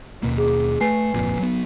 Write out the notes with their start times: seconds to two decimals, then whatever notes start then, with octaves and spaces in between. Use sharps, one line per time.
0.23 D#2 B2 A#3
0.38 G#4 D6
0.81 A3 B4 G#5 C7
1.14 G1 F2 A#2
1.39 F#3 B3